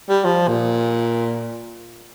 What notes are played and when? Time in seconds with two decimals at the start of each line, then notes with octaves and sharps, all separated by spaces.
0.09 G3
0.25 F3
0.48 A#2